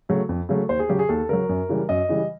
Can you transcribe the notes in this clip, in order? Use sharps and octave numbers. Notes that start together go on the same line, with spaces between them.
C#3 F#3 A3
F2
C#3 F#3 A3
D#2 C5
G#4
C#3 F#3 G4
G#4
D#2 A4
C#3 F#3 A#4
F#2
C#3 E3 G3
F#2 D#5
C#3 E3 G3